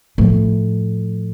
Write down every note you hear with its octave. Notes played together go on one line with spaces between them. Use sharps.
A2 F3